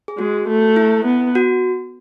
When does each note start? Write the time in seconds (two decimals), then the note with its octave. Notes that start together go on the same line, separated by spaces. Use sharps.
0.08 G#4
0.18 G#3 F#4
0.48 A3
0.76 E4
1.05 B3
1.35 F#4